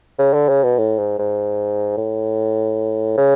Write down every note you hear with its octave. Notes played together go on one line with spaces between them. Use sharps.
C#3
D3
C#3
B2
A2
G#2
G#2
A2
C#3